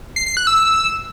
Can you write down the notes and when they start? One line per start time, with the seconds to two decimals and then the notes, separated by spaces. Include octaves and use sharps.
0.16 C7
0.26 C7
0.37 F#6
0.47 E6